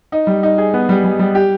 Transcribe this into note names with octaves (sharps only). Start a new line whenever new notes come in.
D#4
G3
D#4
G#4
B3
G3
G3
G3
G4